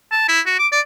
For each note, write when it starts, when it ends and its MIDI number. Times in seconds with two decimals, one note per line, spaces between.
0.12 0.25 81
0.28 0.40 64
0.46 0.57 66
0.59 0.67 86
0.72 0.81 74